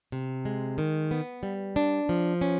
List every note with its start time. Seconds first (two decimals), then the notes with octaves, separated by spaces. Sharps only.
0.12 C3
0.45 G#3
0.78 D#3
1.11 B3
1.43 G3
1.76 D4
2.09 F3
2.41 C#4